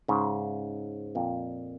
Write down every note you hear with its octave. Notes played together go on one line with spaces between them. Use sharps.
G#2 C#3
F2 A#2